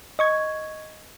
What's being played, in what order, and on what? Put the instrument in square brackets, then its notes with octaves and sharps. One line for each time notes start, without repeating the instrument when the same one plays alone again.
[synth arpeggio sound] D#5 C#6 G#6